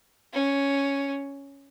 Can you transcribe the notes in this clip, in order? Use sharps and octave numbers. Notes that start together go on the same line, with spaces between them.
C#4